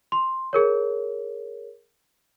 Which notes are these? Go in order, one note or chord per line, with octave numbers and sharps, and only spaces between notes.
C6
G#4 A#4 C#5